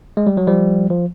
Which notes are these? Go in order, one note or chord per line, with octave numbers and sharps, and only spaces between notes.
G#3
G3
F#3
F3 G3
F3